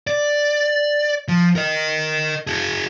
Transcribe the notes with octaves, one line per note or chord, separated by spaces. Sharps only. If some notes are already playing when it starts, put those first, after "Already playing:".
D5
F3
A#4 D#5
F#4 G#4